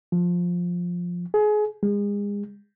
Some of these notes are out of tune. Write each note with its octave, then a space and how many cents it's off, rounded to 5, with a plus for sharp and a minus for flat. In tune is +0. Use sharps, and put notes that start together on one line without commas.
F3 +10
G#4 +25
G#3 -35